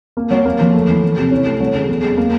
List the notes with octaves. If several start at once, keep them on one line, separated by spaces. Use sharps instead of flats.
A#3
F#3
A#3
F3
A3
E3
E3
C3
C#4
A3
F#3
C#3
E2
G#3
A#3